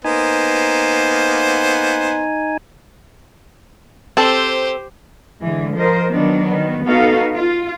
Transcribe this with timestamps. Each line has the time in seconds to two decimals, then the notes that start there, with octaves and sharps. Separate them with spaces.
0.05 A#3 B3 D#4 C5 G#5
4.17 C4 G4 A4 C5
5.42 D3 E3 G#3
5.76 F3 A#4 C5 D#5
6.12 D#3 F#3 B3 D4
6.45 D#3 B3
6.85 B3 D#4 F#4 A4 F5
7.33 F4